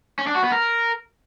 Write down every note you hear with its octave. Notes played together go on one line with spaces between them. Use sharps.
C#4
D4
F#4
B3
A#4